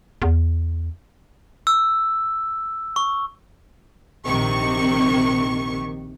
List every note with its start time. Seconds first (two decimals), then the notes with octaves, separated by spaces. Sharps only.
0.22 E2
1.67 E6
2.96 C#6
4.27 A#1 C3 D#3 C#6